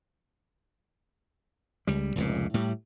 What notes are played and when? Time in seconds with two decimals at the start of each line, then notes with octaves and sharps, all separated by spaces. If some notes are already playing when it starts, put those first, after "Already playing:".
1.87 C#2 G3
2.16 F1 C#2 A#2
2.54 A2 G3